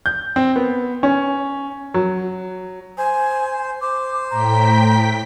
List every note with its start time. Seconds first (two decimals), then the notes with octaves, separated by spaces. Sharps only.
0.06 G6
0.36 C4
0.56 B3
1.03 C#4
1.94 F#3
2.98 C5 G#5
3.81 C5 D6
4.31 A2 G5 A#5 B6